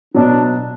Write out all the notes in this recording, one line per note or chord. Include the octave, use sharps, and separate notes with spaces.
B2 F#3 D4